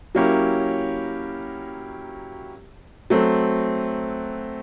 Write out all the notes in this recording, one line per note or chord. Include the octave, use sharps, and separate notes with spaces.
F#3 A#3 C#4 E4 G4
F#3 A3 C4